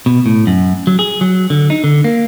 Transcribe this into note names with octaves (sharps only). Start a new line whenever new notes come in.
B2
A2
F#2
F#3
G#4
F#3
D3
D#4
D3
A#3